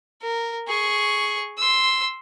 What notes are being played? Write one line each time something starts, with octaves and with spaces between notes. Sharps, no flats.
A#4
G#4 C#6
C6 E6